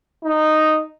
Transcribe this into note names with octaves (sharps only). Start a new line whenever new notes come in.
D#4